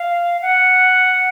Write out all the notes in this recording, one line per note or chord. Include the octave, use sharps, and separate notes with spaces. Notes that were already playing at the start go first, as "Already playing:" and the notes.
Already playing: F5
F#5